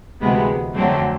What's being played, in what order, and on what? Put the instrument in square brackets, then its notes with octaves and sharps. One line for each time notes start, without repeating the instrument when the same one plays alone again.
[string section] D2 C3 E3 G#3 B3
F2 D3 F#3 A3 C4